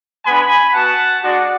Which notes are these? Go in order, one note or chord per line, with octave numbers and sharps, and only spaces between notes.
G#3 B3 D4 G#5 B5
B3 F#4 F#5 A5
G#3 D4 F#4 D5 F#5